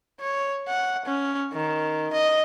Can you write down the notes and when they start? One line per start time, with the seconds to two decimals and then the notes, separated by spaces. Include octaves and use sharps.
0.20 C#5
0.68 F#5
1.06 C#4
1.53 D#3
2.12 D#5